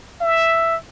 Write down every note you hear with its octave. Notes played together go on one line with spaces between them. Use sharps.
E5